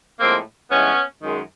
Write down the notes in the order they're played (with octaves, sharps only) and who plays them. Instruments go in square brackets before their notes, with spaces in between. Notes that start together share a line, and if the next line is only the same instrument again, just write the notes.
[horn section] A2 F3 G#3 A#3 C4
G2 E3 G#3 B3 C#4
F#2 D#3 G#3